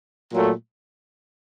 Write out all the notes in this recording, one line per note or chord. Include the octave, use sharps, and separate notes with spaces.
A#2 F#3 A3